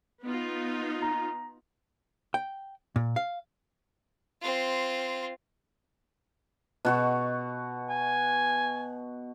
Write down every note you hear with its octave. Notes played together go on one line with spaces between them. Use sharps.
B3 D#4 F4
A#5
G5
A#2
F5
C4 F4
B2 F#4 C#6
G#5